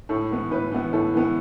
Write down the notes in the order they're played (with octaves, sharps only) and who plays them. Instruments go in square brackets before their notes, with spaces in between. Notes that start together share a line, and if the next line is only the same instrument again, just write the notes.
[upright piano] A2 A4
E3 B3
A2 B4
E3 B3
A2 A4
E3 B3